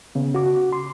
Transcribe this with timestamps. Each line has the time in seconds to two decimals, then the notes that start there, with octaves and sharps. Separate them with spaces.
0.15 C#3 B3
0.35 F#4 D6
0.73 C6